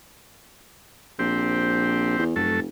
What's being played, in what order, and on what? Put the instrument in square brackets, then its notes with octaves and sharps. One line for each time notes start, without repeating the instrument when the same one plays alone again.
[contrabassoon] A#1 [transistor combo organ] C4 G4
[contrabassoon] E2
[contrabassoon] F1 [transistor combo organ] F#2 A3 A4